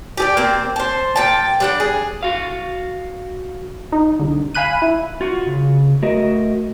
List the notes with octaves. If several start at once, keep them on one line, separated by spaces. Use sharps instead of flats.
G4 G#4 D5
A#3 C4
C5 A5
A#2 G5 A5
G3 D4 F#5
G#4
F#4 F5
D#4
C2 D3
F5 G#5 B5 F#6 D#7
E4
F4 F#4
C#3
A3 F#4 A#4 D#5